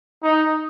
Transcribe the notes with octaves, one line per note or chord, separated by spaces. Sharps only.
D#4